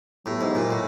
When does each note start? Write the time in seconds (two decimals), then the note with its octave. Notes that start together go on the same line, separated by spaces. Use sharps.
0.25 A2 F#3 B3 E4 G4
0.41 G#2
0.55 A#2
0.71 A2